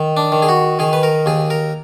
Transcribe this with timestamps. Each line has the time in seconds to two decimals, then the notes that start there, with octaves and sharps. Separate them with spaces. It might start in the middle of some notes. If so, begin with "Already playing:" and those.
Already playing: D#3
0.17 D4
0.32 D#3
0.42 G#4
0.48 F#4
0.79 D#3 G#4
0.93 B4
1.03 A#4
1.26 D#2 G#4
1.50 A#4